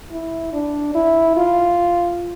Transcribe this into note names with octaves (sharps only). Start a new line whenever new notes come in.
E4
D4
E4
F4